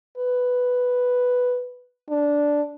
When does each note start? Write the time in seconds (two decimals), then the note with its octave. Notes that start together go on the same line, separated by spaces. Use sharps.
0.18 B4
2.10 D4